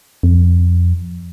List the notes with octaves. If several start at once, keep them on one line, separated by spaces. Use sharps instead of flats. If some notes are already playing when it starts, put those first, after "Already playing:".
F2